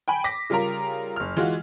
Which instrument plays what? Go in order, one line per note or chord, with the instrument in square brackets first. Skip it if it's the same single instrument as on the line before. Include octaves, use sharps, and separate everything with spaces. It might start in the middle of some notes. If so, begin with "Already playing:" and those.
[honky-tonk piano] G5 G#5 B5
D6 A#6 B6
C#3 G3 F4 A#4 A#5
F#1 F6
E3 G#3 F4 F#4